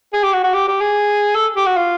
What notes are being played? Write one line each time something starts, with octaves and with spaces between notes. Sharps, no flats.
G#4
G4
F#4
F#4
G4
G4
G#4
A4
G4
F#4
F4